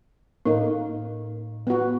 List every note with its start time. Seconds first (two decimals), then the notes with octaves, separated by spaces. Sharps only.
0.46 A2 A#3 D#4
1.67 B3 F#4